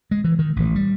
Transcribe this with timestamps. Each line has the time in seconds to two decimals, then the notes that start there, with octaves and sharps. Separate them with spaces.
0.11 G#3
0.24 E3
0.39 D#3
0.56 A1
0.76 G3